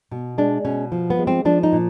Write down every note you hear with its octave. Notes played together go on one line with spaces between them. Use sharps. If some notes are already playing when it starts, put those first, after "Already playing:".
B2
G#3 D4
B2 C#4
F3
B3
G#3
C4
F3 D4
D#4
A#2